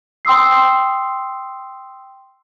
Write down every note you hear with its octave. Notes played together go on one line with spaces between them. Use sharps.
G5 C6 D#6 E6 C7